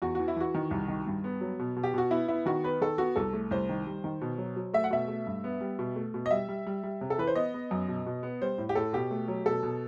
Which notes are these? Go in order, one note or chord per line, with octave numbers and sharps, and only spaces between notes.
E2 F#4
E3 F#4
E4
E3 F#4
D#3
C2
D#3
G2
B3
F#3
B2
B2
G4
B2 F#4
B3 E4
B3 E4
D#3 F#4
B3 B4
D#3 A4
B3 F#4
C2 A4
A3
C2 C5
D#3
G3
D#3
B2
F#3
F#3
A3 E5
F#5
B2 E5
A3
G2
B3
G3
B2
A3
B2
D#5
G3 E5
G3
G3
G3
C3
A4
E3 B4
C5
B3 D#5
B3
F#2
B2
B2
B3
G3 C5
A2
G4
A2 A4
B2 G4
A3
F#3
B2 A4
B2